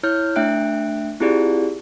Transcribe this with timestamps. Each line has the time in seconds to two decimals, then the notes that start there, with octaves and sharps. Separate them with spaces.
0.03 E4 C#5 F6 G6
0.36 A3 D4 E5 G5 F#6 D7
1.20 C4 E4 F4 G4 G#4 D5